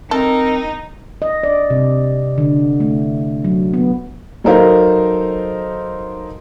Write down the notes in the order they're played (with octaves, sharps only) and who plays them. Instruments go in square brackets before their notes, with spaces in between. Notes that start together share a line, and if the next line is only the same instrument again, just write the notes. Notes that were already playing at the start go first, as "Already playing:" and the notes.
[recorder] C4 [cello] D#4 [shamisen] A4 [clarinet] A#4
[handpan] D#5
D5
C3
D3
A3
F#3
B3
[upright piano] F#3 D#4 A4 A#4 C5 F5